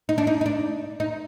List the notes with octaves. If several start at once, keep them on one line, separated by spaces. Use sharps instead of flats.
D#4
D4
D#4
D#4
D4
D#4